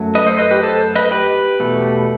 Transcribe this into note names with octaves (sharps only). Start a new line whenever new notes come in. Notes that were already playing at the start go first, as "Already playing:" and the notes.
Already playing: F#2 F#3 A3
B4 D#5
A4 C5
B4 D#5
G4 B4
A4 C5
B4 D#5
G4 B4
E2 B2 A3